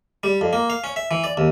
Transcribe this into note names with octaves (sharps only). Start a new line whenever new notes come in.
G3
F2
A#3
F5
C#4
E5
E3
D5
D#2